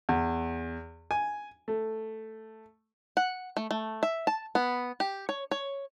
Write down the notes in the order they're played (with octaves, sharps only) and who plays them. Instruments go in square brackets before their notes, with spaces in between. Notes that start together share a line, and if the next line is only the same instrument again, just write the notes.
[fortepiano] E2
G#5
A3
[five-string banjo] F#5
A3
A3
E5
A5
B3
G4
C#5
C#5